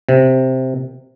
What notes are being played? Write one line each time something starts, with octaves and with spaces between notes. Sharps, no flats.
C3